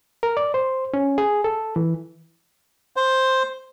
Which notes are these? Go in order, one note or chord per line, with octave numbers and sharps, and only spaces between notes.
A#4
D5
C5
C#4
G#4
A4
E3
C5